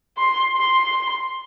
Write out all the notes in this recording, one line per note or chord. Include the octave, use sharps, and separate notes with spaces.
C6
C6